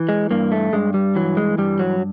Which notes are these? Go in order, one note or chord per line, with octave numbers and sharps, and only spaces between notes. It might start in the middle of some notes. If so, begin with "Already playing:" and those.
Already playing: E3
G#3
G2 A#3
A3
G2 G#3
G3
E3 F#3
G#3
G2 G3
F#3